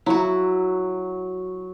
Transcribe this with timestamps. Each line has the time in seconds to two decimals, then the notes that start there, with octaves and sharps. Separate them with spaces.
0.06 F#3 E4 F#4